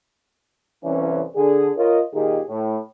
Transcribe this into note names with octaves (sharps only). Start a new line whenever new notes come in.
C2 E3 C#4
D3 G#4
F4 A#4 C#5 D#5
A#2 D#3 D#4 G4 G#4
A2